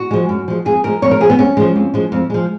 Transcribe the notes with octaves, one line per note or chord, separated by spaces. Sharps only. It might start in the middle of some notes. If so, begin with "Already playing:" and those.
Already playing: F#4
F3 G#3
F#2
F3 G#3
F2 G#4
F3 G#3 A#4
F2 C#5
A#4
F3 G#3 G#4
B3
F2 C#4
F3 G#3
F2
F3 G#3
F2
F3 G#3